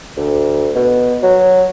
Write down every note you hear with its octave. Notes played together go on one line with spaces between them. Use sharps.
D2
B2
F#3